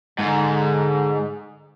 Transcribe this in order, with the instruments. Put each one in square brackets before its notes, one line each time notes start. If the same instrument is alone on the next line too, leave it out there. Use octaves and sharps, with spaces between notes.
[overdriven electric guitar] G#2 [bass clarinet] D3